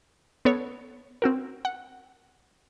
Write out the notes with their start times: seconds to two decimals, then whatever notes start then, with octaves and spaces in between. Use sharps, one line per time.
0.45 B3 A4 C#5
1.22 C4 F#4 A#4
1.65 F#5